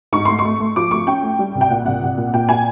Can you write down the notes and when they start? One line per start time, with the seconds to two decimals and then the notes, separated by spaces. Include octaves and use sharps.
0.13 G#2 C#6
0.25 A3 C6
0.39 C#6
0.45 A3
0.60 A3
0.76 F3 D6
0.91 A3 C#6
1.07 C#4 G5
1.23 A3
1.39 G3
1.55 C2
1.61 G5
1.70 A#2 F#5
1.86 C2 F#5
2.02 C2
2.18 A#2
2.34 A#2 G5
2.49 A#2 G#5